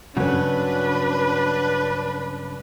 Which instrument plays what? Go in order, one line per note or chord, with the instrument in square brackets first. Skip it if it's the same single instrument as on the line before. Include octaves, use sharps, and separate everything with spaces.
[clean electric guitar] G2 C#3 F#3 [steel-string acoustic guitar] C#4 F#4 [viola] D4 B4